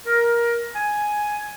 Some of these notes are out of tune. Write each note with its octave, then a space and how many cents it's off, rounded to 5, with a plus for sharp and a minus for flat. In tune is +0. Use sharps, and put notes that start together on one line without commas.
A#4 +15
G#5 +5